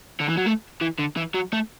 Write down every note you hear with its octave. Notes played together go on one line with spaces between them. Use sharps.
D3
E3
F#3
A3
E3
D3
E3
F#3
A3